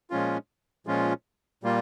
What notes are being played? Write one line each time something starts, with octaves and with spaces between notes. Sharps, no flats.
A#2 F3 G#3 C#4 F4
A#2 F3 G#3 C#4 F4
A#2 G3 A#3 F4